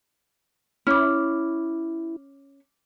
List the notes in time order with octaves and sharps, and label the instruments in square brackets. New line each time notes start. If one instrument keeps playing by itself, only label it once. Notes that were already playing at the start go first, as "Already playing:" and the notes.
[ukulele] C#4 [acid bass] E4 [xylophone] D6 F6